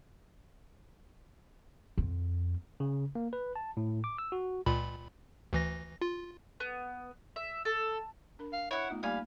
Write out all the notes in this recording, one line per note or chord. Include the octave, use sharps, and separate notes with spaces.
F2
C#3
A#3
B4
A5
A2
D6
E6
F#4
C#2 A#2 B5
D2 E3 A#6
F4
B3
E5
A4
D4 A#4 B5
F5
E4 C#5 F#5
A3 B3 D#4 F4
G3 A#3 D#4 F5 G#5 B5